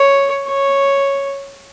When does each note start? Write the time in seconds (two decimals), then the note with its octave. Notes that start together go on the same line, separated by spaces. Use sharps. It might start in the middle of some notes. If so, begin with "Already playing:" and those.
Already playing: C#5
0.48 C#5